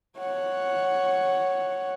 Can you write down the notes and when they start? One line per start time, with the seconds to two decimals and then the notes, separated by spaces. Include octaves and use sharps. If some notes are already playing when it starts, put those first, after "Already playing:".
0.18 C#5 F#5